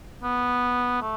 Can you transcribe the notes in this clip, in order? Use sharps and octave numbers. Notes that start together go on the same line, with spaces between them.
B3
A3